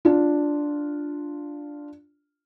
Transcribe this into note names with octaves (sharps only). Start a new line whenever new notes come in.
D4 F4